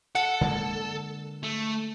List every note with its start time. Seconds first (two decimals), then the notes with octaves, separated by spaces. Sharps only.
0.15 A4 F#5
0.41 D3 G#3 A#3
1.43 A3